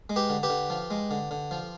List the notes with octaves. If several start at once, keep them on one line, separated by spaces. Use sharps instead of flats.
G#3
G4 B4
D3
G4 B4
D3
F3
G#3
D3
D3
F3